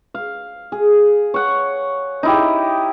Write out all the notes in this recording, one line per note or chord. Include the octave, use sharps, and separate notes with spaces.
F5
G#4
C#5 F#5
D#4 E4 G4